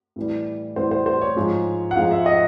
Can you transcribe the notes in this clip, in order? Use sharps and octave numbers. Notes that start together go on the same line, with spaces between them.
A2 E3 G3
A2 E3 G3 C5
C5
C5
C#5
G#2 F3 G#3
F#5
G#2 F3 G#3 F5
E5
D#5